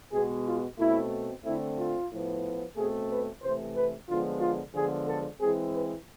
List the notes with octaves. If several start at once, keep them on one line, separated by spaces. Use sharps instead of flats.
B2 G#3 B3 G#4
F4
B2 A3 C4 E4
D3 A3 C4 E4
F4
A2 F3 B3
B2 A3 C4 G#4
B4
C3 E3 A3 C4 C5
B4
D3 F3 G#3 B3 F4
F4
D3 F3 G#3 B3 G#4
A4
E3 G#3 C4 G#4
B4